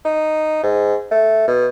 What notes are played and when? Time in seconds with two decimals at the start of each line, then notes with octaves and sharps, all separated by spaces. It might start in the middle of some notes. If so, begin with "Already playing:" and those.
0.05 D#4
0.63 G#2
1.11 A3
1.48 B2